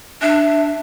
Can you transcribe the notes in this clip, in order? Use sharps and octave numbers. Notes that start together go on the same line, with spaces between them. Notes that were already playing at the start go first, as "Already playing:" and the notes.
D4 E5